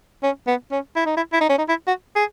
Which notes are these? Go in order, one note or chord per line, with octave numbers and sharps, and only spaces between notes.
C#4
B3
C#4
E4
D#4
E4
E4
D#4
C#4
D#4
E4
F#4
G#4